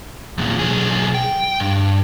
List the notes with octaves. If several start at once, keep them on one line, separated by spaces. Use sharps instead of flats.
E2 A#2
B1 G#4
G5
G2